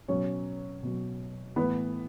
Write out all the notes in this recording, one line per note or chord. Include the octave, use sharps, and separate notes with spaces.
B2 F#3 C#4 C#5
B2 F#3
A2 E3 B3 B4